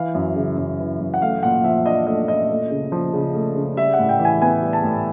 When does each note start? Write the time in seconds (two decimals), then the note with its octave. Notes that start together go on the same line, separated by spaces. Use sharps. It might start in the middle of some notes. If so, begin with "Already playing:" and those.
Already playing: E3 F5
0.14 F#2
0.36 C#3
0.58 F#2
0.79 E3
1.00 F#2
1.14 F#5
1.22 A3 F5
1.43 A#2 F#5
1.64 F3 E5
1.86 D4 D#5
2.07 A3 D#5
2.28 A#2 D#5
2.49 A3
2.71 C#3
2.92 F3
3.13 C#3
3.34 A3
3.56 C#3
3.77 G3 E5
3.93 F#5
3.99 A2
4.09 G5
4.20 E3
4.25 G#5
4.41 B3 G#5
4.62 G3
4.73 A5
4.84 A2